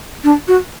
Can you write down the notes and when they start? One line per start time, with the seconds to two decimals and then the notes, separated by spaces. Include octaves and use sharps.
0.24 D4
0.48 F#4